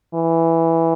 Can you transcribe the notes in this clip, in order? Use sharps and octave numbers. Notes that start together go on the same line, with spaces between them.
E3